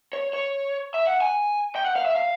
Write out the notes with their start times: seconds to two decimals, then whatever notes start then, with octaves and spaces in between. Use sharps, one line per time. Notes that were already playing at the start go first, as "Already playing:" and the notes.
0.13 C#5
0.33 C#5
0.94 E5
1.07 F#5
1.21 G#5
1.76 G5
1.85 F#5
1.96 F5
2.05 E5
2.16 F5